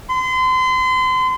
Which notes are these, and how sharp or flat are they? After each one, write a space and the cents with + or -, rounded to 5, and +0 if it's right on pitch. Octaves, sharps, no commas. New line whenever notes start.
C6 -35